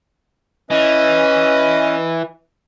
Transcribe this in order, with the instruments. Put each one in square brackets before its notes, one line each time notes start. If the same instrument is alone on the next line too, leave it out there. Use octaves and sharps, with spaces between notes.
[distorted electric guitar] E3 [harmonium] C#4 B4 [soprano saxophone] D#5